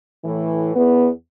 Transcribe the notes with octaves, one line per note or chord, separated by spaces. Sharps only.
A2 E3
E2 B3